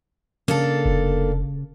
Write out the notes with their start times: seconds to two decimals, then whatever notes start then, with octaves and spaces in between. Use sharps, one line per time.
0.48 C#3 A#3 D4 A4
0.85 F1